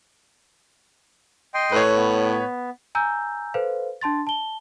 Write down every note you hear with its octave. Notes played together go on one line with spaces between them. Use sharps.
D#5 G5 C6
A2 B4 C#5
B3
G#5 A#5 E6 G6
A4 B4 C5 F5
D4 A5 C6 A6
A5 G7